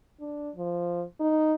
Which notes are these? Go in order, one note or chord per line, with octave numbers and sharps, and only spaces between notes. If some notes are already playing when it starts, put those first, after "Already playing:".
D4
F3
D#4